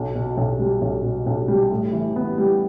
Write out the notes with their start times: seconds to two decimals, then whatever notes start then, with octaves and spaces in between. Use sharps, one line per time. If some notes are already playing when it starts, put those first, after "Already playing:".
Already playing: B1
0.15 B2
0.37 B1
0.59 G3
0.81 B1
1.04 B2
1.27 B1
1.48 G3
1.71 A2
1.93 E3
2.16 B3
2.38 G3